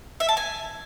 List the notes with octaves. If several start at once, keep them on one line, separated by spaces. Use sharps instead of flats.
E5
A5
G#5